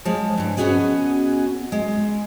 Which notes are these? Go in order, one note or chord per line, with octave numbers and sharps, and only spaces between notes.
F3 G#3 C#5 A5
G2 E3
B3 C#4 F#4 G#4 D#5
G#3